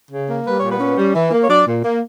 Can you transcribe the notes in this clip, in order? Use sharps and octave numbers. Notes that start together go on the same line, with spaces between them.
C#3
A#3
G3 B4
A#2 C#5
B3 B4
C#4
G3
E3
A#3
C#5
F#3 D4 D5
A#2
A#3